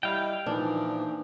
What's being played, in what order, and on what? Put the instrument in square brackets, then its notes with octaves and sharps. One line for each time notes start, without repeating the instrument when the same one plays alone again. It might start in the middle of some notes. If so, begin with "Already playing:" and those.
[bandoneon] G3 E4 [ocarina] D#5 [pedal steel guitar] F5 G5
[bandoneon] A#2 E3 F3 [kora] D4 [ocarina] D#4